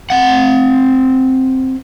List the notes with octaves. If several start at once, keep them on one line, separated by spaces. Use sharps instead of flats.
C4 F#5